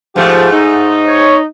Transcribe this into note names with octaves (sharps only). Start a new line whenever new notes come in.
G#2 F3 A3 G4
D#4
C#5